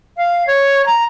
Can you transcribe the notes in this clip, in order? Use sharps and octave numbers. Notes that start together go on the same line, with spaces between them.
F5
C#5
A#5